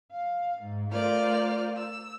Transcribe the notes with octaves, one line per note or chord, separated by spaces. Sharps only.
F5
G#2
A3 F4 A#4 C5 D5 F6
E6